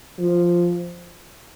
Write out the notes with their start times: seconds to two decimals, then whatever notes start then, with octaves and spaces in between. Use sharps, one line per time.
0.19 F3